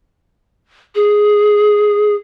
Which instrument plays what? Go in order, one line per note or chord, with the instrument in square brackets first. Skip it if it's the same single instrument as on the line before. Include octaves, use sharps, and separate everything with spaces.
[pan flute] G#4